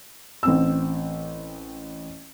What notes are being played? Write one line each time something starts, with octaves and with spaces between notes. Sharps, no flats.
A1 C4 E6